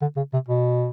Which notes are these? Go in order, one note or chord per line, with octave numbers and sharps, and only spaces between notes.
D3
C#3
C3
B2